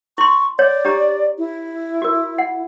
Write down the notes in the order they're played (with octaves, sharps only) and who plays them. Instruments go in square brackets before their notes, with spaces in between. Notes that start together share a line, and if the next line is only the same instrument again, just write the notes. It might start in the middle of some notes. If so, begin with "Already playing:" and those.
[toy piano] E4 C6 [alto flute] C#6
[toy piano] C#5 [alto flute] D5
[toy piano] D4 G4 A#5
[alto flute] E4
[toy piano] F#4 A#4
F#5